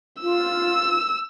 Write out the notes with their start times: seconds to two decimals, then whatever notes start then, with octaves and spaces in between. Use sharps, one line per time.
0.21 F4 E6